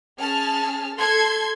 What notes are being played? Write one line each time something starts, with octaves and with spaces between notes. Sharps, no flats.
C#4 G#4 A5 F6
A4 C6 G#6